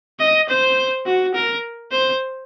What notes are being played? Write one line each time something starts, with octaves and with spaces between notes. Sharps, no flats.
D#5
C5
F#4
A#4
C5